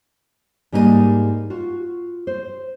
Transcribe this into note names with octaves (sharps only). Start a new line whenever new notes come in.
G#2 G3 A#3 D#4 B4 D#5
F4 F#4
C5